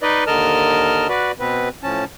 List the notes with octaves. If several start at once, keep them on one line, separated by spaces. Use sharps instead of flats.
D#4 B4 D5 D#5
D#2 D3 A#4 D#5 A5 F6
F#4 B4 D5
B2 B3 C4 B4
A2 F3 C#4 A5